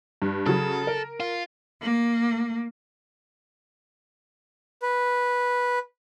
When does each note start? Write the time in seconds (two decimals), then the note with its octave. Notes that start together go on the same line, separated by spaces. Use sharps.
0.22 G2
0.46 C#3 F#3 A4
0.87 A#4
1.20 F4
1.81 A#3
4.82 B4